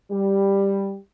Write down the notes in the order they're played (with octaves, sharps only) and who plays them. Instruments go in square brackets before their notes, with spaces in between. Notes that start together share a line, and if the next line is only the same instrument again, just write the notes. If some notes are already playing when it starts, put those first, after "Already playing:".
[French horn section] G3